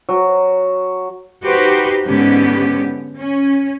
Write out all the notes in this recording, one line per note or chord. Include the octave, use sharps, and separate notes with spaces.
F#3
D#4 F#4 G4 B4 C5
G#2 D3 B3 C#4 G4
C#4